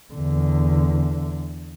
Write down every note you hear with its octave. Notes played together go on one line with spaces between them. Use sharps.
E2 D3